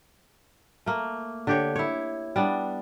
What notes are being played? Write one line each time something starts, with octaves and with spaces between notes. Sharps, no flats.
A3 A#3
D3 G4 C#5
E4 C#5
G3 B3 D4